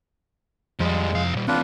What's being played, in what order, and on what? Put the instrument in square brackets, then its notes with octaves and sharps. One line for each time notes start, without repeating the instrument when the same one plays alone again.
[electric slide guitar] F2 [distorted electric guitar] F3 G3 [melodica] G#3
[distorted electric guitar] C2 F5
A#2 G3
[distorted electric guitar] E2 C3 [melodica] D4 F4 B4